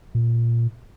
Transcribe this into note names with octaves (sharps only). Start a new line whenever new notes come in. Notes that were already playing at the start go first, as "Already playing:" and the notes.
A#2